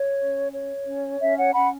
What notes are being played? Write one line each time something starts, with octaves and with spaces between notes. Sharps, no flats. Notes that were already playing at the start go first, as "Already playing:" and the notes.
Already playing: C#5
C#4
C#5
C#4
C#4 E5
C#5 F#5
C#4 F#5 B5